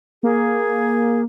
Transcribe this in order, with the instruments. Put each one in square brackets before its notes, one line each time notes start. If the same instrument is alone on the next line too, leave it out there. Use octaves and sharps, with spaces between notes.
[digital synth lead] A#3 [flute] G#4